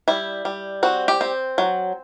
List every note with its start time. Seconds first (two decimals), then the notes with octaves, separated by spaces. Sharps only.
0.08 G3 E4
0.45 G3
0.83 C4 F#4
1.08 G4
1.21 C4
1.58 F#3